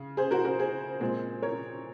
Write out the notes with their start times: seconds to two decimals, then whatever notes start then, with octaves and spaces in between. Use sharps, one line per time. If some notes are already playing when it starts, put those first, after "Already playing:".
Already playing: C#3
0.17 G#4 C5
0.31 F#4 A#4
0.45 F#4 A#4
0.59 G#4 C5
1.00 A#2 G#3 C4
1.43 A#4 C#5